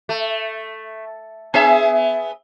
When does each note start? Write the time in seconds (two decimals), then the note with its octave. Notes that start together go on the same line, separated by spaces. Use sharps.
0.09 A3
1.54 B3 G#4 E5